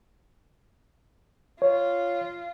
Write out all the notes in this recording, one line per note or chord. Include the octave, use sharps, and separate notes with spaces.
F4 C#5